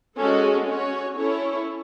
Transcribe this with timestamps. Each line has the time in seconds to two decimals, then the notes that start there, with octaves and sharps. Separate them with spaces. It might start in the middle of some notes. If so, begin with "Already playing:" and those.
0.18 G#3 C#4 F#4 A4
0.68 C#4 F#4 C#5
1.17 C#4 E4 A4 C#5